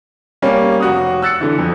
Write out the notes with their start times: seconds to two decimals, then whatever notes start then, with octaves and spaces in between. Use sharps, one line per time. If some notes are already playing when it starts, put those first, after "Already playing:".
0.42 G3 A#3 C#4
0.80 F1 F#4 D#6
1.22 E6 F#6 A6 C#7
1.41 D3 E3
1.58 F2